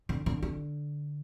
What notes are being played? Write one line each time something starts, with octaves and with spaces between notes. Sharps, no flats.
D3
D3
D3